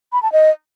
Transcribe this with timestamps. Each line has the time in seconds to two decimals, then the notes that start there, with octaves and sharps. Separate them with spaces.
0.12 B5
0.22 A5
0.32 D#5